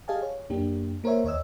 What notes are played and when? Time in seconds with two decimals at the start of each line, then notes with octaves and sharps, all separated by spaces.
0.08 G4 G#4 D#5 F5 G#5 A5
0.22 C#5
0.50 F#2 A#3 D4 G4
1.04 A#3 A#4 C5 C#5 E5
1.24 D#2 C#5 D#5 E6